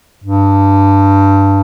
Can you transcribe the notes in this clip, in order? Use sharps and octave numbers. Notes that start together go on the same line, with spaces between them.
G2